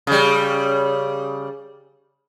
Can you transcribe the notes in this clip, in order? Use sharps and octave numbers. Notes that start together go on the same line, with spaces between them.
C#3 G3